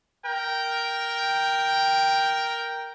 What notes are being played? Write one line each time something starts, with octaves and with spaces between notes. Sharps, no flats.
A#4 G5